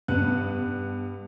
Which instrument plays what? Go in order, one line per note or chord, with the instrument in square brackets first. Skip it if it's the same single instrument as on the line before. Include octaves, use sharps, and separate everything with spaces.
[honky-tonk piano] G2 B3 F#6